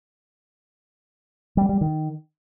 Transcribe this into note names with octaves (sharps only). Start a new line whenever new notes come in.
G3
G3
D#3